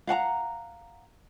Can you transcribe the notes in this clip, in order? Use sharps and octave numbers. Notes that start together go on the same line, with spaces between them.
F5 F#5 A5 A#5